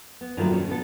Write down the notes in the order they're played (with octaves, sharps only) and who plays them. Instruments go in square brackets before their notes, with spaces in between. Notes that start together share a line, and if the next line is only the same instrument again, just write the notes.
[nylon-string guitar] B3
G2 D#3 F#3 A3 A#3 F4
A#2 D#3 C#4 A4
D3 B3 A4